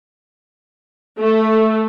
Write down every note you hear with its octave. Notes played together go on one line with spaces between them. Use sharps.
A3